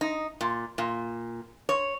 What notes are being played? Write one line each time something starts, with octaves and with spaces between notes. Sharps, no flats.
D#4
A#2
A#2
C#5